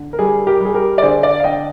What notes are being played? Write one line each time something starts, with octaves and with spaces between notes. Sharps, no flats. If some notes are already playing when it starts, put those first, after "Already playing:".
Already playing: D3
A#4
G3 G#4
G4 A#4
G3 G#4
G4 A#4
D5
D3 G#4 C5
D5 F5
F5
D3 D#5 G5